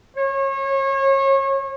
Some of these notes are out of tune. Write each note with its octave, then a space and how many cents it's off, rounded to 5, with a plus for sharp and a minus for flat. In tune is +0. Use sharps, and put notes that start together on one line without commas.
C#5 -30